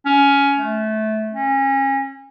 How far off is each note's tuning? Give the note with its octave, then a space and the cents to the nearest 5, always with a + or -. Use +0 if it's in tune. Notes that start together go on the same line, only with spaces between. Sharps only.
C#4 +15
A3 -20
C#4 -30